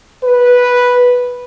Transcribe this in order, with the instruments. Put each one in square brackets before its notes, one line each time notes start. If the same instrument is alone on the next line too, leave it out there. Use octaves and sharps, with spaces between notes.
[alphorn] B4